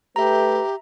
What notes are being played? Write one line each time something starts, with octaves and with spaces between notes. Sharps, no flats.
A3 G4 B4 E5 A#5